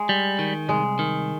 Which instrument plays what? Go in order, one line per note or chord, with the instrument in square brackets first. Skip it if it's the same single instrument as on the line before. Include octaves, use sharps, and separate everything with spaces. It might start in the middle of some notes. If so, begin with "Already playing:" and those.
Already playing: [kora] G#3
[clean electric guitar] G3
D#3
[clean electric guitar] C2 [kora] G#3
[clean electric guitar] D#3